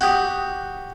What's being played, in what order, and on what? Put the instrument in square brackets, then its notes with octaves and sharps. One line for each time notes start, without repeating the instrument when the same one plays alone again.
[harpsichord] F#4 G4 [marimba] G5 D#6